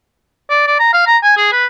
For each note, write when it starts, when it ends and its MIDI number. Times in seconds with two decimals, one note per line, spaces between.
0.50 0.63 74
0.67 0.77 74
0.79 0.91 82
0.93 1.04 77
1.07 1.17 82
1.23 1.36 80
1.37 1.51 68
1.52 1.66 71